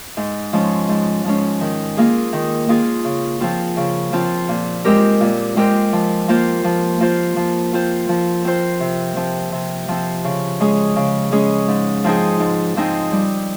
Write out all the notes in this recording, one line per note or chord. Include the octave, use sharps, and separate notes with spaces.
G#2
F3 G#3 C#4
G#2
F3 G#3 C#4
D#3
A#3 F4 G#4
D#3
A#3 F4 G#4
C#3
F3 C4 F4
C#3
F3 C4 F4
A#2
G#3 C4 G4 A#4
A#2
G#3 C4 G4 A#4
F3
A#3 F4 C5
F3
A#3 F4 C5
F3
C4 F4 C5
F3
C4 F4 C5
C3
F3 C4
C3
F3 C4
C#3
G#3 C#4 G#4
C#3
G#3 C#4 G#4
G#2
F3 C4 D#4 G#4
G#2
F3 C4 D#4 G#4
G3